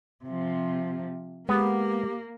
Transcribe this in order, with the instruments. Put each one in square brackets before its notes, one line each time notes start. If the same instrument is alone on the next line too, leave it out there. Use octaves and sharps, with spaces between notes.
[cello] C3 F3
[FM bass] G#3 [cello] A#3 [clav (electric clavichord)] B3 [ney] G4